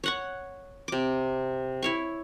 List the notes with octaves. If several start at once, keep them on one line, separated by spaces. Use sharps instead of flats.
C#5 F#5 C#6
C3 D6
E4 C#5 C#6